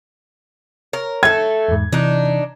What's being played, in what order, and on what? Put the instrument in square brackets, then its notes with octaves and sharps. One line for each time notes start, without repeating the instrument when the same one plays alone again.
[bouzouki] A#4 [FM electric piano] C#5
[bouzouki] A3 A4 [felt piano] G#6
[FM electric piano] E2 G#2
[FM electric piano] C3 E3 [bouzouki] D4 D#4